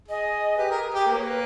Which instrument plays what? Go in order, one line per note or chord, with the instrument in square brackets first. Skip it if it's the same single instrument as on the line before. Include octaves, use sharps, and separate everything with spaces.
[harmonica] G#4 [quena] D#5
[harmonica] G4 [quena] B4
[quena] G#4 [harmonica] A#4
[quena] G#4
[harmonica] G4 [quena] G#4
[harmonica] A#3 [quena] B4
[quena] C#5
B4